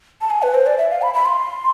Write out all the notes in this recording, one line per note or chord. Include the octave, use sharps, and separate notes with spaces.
A5
G#5
B4
C5
D5
E5
F5
B5
B5
C6